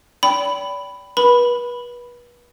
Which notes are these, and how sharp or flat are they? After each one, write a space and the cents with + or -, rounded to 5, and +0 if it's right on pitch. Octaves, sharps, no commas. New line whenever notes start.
D5 -40 G5 +0 B5 +10
B4 -30 B5 +0